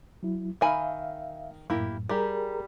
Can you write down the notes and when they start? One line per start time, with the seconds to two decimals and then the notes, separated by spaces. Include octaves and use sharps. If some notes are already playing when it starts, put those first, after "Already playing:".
0.23 F#3 E4
0.61 D#3 E5 F5 G#5 B5
1.70 F#2 A2 A#3 E4 G4
2.09 G3 G4 G#4 A#4 A#5